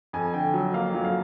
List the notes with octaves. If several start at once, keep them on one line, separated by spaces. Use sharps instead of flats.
F2 G#5
D3 G5
F#3
A#3 F5
F#3
F5